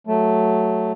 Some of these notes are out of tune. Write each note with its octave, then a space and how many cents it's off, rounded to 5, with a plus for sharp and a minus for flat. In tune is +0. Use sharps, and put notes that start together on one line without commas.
F#3 +0 A3 +0